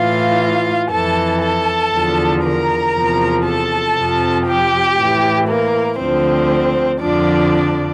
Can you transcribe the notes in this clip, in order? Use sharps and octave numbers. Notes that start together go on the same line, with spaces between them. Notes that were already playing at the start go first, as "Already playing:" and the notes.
Already playing: A2 E3 F4 F5
F2 E3 A4 A5
A4 A5
E2 D3 F3
A#4 A#5
E2 C3 F3
A4 A5
F2 C3 F3
G4 G5
A2 E3
A#3 A#4
D2 D3 F3 C4 C5
F2 D3 F3 D4 D5